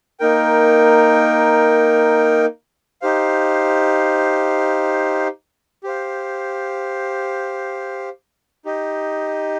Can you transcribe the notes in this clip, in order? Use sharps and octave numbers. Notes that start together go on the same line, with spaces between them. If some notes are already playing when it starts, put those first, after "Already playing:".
A#3 D#4 A#4 G5
D#4 G4 C5 F5
G4 C5 F5
D#4 G4 D#5